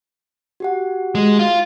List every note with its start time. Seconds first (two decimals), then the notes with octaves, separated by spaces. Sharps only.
0.60 F#4 G4 F#5
1.15 G#3
1.39 F4